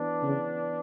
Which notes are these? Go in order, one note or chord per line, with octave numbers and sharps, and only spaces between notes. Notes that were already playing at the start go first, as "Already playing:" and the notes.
Already playing: E3 B3 D4
C#3